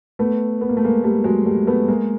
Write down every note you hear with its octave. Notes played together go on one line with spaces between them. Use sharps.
A3 B3
B3
A#3
A3
G#3 A#3
G3 A3
F#3 G#3
G3 A3
A3 B3
G#3 A#3